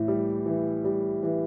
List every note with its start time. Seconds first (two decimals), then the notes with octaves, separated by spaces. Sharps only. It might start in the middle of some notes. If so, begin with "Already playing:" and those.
Already playing: A2 E3
0.08 G3
0.46 E3
0.84 G3
1.23 E3